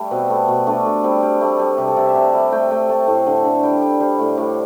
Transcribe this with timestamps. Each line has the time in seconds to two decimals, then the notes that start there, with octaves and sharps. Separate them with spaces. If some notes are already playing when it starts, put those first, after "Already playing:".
Already playing: G3 A3
0.11 B2 C4
0.30 A3 B3
0.48 B2
0.67 A3 D4
0.85 A3
1.04 G3 C4
1.22 G3
1.41 G3 A3
1.59 G3
1.77 C3 G4
1.88 A4
1.97 C3 D5
2.06 E5
2.15 C3 F#5
2.34 G3
2.52 A3 G5
2.71 A3 G5
2.89 A3 A5
3.08 A2
3.26 D3
3.44 D3
3.63 G3 G5
3.82 G3
4.00 G3 C5
4.19 A2
4.37 A2 D5